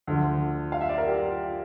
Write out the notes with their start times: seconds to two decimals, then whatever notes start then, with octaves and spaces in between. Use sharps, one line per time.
0.07 D2 D3 F3
0.72 F5
0.81 E5
0.89 D5
0.98 A#4
1.07 G4
1.16 F4